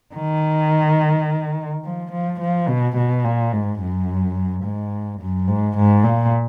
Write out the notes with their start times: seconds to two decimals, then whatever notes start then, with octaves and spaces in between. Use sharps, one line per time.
0.15 D#3
1.84 F3
2.12 F3
2.40 F3
2.68 B2
2.96 B2
3.25 A#2
3.52 G#2
3.81 F#2
4.64 G#2
5.21 F#2
5.48 G#2
5.77 G#2
6.04 A#2